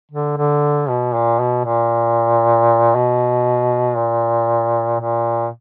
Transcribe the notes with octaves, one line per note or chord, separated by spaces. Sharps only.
D3
D3
B2
A#2
B2
A#2
B2
A#2
A#2